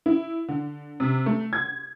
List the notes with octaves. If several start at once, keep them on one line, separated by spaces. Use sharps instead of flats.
E4
D3
C3
A3
G#6